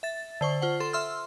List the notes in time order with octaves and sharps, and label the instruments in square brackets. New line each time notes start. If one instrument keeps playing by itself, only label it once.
[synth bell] E5 A6
D3 C5 C#6
F4 C5 F#5
A4 C6
E5 C6 E6 F6